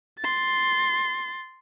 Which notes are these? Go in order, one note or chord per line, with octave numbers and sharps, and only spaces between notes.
C6 A6